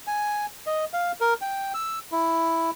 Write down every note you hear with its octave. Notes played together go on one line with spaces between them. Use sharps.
G#5
D#5
F5
A#4
G5
E6
E4